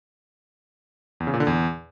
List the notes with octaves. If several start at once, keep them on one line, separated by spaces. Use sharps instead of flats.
E2
C#3
A#2
D3
E2